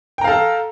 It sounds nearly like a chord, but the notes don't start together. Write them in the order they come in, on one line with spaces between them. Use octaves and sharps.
G5 A#5 F5 A4